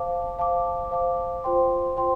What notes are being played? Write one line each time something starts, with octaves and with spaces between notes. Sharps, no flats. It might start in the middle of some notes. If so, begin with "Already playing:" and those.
Already playing: C5 F5 A5 D6
C5 F5 A5 D6
C5 F5 A5 D6
F4 C5 G5 C6
F4 C5 G5 C6